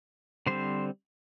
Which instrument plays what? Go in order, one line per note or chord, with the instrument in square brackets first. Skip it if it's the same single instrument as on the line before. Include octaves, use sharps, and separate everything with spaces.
[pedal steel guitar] D3 G3 C4 C5